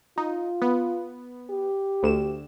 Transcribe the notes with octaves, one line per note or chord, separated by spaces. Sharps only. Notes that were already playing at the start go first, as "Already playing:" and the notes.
D#4 F4
B3
G4
D2 E7